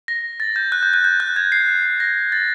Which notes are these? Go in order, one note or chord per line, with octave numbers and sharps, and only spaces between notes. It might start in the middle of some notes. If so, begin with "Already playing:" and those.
A#6
A6
G6
F#6
G6
F#6
G6
F#6
G#6
C7
A#6
A6